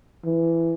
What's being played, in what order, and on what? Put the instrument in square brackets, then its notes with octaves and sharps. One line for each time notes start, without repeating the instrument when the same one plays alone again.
[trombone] E3